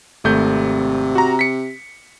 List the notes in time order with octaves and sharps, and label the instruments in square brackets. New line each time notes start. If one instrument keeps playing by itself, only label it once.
[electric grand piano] G#1 A3 G6 [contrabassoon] C3
[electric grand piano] F#4 A#5
B6 C#7